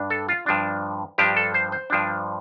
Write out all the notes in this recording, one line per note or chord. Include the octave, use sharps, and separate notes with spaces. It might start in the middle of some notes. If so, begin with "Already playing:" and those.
Already playing: G2 D4
A4
F4
G2 F3 D4
G2 F3 D4 G4
A4
C5
C5
G2 F3 D4